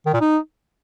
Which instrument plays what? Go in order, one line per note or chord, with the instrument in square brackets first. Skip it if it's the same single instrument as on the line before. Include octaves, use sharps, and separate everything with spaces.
[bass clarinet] D#3
A#2
D#4